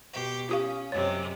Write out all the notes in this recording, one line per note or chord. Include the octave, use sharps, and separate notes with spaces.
B2 G4
C#4 F4 G4 F5
F#2 C3 G#3 C#5